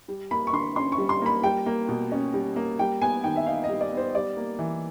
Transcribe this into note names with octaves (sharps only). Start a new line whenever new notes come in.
G3
A#3 B5
C#6
D3 C6
C#4 C6
C#6
G3
C6
A#3 B5
G3 G5
A#3
B2
C#4
G3
A#3
G3 G5
B3 G#5
D#3 G5
E5
D#4 F5
D#5
G3
D5
B3
C5
G3 D5
A#3
E3